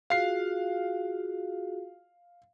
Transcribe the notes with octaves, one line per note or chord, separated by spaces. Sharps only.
F4 F#4 G#4 F5 C7